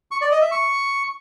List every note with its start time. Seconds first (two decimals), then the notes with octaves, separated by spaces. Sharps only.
0.11 C#6
0.21 D5
0.31 D#5
0.41 E5
0.51 C#6